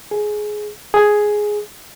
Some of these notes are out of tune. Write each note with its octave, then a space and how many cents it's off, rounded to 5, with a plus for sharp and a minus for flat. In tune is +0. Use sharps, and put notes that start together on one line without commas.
G#4 +15
G#4 +5